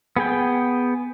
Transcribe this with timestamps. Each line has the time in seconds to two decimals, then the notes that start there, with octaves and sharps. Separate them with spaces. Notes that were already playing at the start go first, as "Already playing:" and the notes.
0.17 B3 G#4 G5